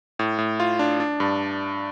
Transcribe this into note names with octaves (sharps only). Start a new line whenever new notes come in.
A2
A2
F4
D4
D4
G2